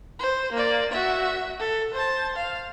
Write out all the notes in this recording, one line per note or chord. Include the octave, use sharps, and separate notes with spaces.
C5
A#3 D5
F#4 E5
A4
C5 A5
F5